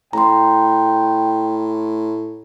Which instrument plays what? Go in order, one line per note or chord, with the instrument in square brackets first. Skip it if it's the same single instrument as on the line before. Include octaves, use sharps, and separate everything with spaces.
[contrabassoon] A2 [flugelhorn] G5 [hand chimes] A#5 C6